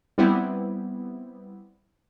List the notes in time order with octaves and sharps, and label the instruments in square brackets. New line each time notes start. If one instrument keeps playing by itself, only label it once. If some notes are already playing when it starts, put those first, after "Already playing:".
[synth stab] G3 B3 C4 E4